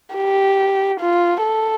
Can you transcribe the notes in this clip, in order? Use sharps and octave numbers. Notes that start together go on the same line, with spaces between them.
G4
F4
A4